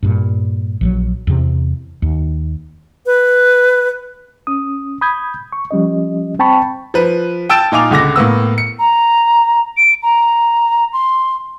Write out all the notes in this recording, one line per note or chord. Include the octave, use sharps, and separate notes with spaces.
G2 A#2
A#1 D#3 F#3
E2 C3
D#2
B4
C#4 D#6
B5 D#6 G6 G#6
C#6
F3 G3 C#4 D#5
C4 G5 A5 B5 C#6
F3 B4
G5 A5 E6 A6 D7 E7
A#2 D#4 F4 G#5 D6 F7
C#2 D3 D6 A#6
A2 A#3 B3 E6
C#7
A#5
D7
A#5
C6